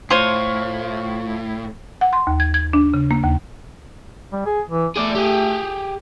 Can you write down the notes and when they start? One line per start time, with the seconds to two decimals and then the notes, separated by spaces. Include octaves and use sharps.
0.10 A2 F4 C5 C#5
2.01 F#5
2.13 C6
2.27 D#2
2.40 G#6
2.54 G#6
2.73 D4
2.94 C#3
3.11 A#3
3.23 D#2
4.33 G3
4.46 G#4
4.70 E3
4.96 A3 G#4 D5
5.15 G4 G#4